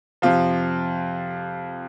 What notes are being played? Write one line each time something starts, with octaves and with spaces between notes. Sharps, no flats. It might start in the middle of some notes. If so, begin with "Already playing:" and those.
F2 C3 F3 F4